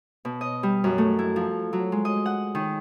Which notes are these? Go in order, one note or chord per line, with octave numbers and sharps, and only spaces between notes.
B2
D#5
G3
F#2
A3
E4
F3
F#3
G#3
D#5
F#5
D#3